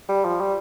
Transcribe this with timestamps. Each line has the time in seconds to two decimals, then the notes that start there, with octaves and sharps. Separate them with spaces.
0.09 G3
0.25 F3
0.41 G3